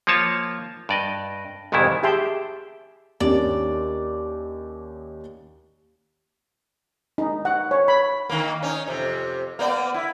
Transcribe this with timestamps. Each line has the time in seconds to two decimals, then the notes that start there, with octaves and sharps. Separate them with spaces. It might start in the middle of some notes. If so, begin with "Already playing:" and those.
0.07 F3 A#3 F4 C#5 A5
0.89 G2 D5 D#5
1.72 C2 F2 G#2 D#3 E3 E4
2.03 G4 G#4 E5 G5 A5 C6
3.20 D#2 C#4 D4 D5
7.18 D#4
7.45 F#5
7.71 C#5
7.88 B5
8.29 D#3 A#3
8.63 C#4 D#4
8.88 F2 C3
9.59 A#3 B3 D5
9.94 E4